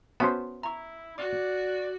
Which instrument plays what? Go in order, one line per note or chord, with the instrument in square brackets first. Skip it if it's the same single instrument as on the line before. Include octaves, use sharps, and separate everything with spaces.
[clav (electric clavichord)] B3 C#4 C5 [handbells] F#4 E5 A5
[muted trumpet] E4 [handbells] A#5 C#6
[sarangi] F#4 [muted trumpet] D5 [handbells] D6